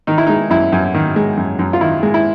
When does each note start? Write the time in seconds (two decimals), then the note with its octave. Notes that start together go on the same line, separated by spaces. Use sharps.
0.07 D#3 D#4
0.18 E4
0.27 G#3 D#4
0.50 F#2 E4
0.72 F#2
0.94 D#3
1.16 G#3
1.37 F#2
1.59 F#2
1.73 F4
1.81 D#3 E4
2.03 G#3
2.14 E4